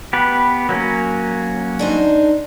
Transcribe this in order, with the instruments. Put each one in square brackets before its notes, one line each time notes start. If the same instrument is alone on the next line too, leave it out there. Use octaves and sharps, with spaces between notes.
[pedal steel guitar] B3 G4 B4
F#3 A#3 C#4
[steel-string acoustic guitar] D4 D#4 C5